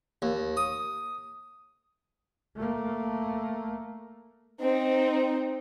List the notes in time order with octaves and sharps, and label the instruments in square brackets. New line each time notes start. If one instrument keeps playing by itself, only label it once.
[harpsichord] D#2
D#6
[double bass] A3 A#3
[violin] C4 D#4